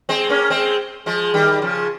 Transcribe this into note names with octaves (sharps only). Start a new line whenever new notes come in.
G#3 C4
A#3 C#4
G#3 C4
F3 G#3
D#3 G3
C#3 F3